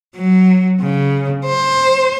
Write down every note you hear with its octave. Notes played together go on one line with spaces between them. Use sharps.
F#3
C#3
C5